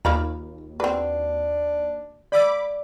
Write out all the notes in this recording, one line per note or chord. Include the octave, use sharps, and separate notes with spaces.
D#2 A#3 F4 F5 B5
C4 D4 F#4 B4 F#5
D5 F5 B5 D6 E6